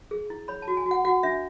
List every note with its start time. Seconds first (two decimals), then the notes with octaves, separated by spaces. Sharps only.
0.11 G#4
0.30 E4
0.48 C#5 B5
0.62 A5
0.68 F#4
0.77 G#5
0.86 F#4
0.91 F#5
1.05 F#4 F#5
1.23 D4 E5